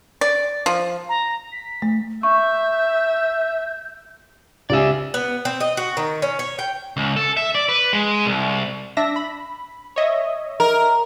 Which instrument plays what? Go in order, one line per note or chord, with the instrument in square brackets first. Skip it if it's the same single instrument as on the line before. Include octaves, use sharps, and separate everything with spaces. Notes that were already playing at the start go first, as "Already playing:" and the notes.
[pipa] D5
F3
[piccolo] A#5
B6
[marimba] A3
[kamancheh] E5 [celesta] C#6 [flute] G6
[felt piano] C#2 G4 G#5 [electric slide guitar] D5 E5
[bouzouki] B3
C4
D#5
F#4
D#3
C#4
C#5
G5
[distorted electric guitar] C#2
A4
E5
D5
B4
G#3
C2
[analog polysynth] D4 E5 A#6
B5
C#5 D#5 E5
[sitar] A#4